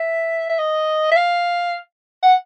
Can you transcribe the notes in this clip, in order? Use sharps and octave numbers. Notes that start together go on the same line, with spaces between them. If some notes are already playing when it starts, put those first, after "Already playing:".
Already playing: E5
E5
D#5
E5
F5
F#5